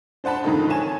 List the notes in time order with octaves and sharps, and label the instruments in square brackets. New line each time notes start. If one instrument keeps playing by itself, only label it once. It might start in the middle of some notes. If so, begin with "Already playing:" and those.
[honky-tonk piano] D4 C5 F#5 A5 B5
F2 G#2 D3 D#3 D#4
D#3 C#5 G#5 A5 E7